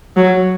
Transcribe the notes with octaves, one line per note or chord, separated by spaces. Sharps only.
F#3